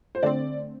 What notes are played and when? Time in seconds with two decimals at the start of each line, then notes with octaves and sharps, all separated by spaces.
0.15 C5
0.23 D3 A3 C4 D5